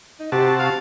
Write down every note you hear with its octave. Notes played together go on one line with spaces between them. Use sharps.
D#4
C3 F#4 G4 A5
F5